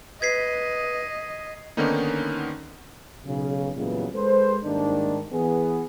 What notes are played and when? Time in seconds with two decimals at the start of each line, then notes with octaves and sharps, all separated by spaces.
0.22 B4 D#5 G#6 B6 C7
1.77 D3 D#3 A#3 B3 C#4 D#4
3.25 B1 C#3
3.76 A#2 C#3 E3 F#3 G3 B3
4.15 G#3 A4 B4 C5
4.64 G#2 D#3 G3 A#3 D4
5.33 E3 B3 G#4